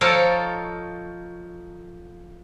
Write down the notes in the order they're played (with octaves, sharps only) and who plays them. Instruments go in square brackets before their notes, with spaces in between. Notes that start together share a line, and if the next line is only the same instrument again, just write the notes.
[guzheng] F3 D#4 F4 A4 A#4 C#5